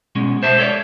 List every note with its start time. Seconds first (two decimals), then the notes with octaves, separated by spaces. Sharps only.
0.15 B2 G#3 C#4
0.43 C5 E5 A5
0.58 A4 C#5 D5